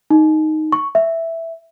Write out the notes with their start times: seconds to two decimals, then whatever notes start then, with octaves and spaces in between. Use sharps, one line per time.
0.10 D#4
0.72 C#6
0.95 E5